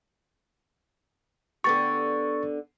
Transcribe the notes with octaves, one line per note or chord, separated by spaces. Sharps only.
D3 B3 G4 C#6 A6